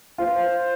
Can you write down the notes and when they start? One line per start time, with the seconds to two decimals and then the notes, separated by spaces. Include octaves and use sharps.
0.18 F4 C5
0.27 B4
0.33 C5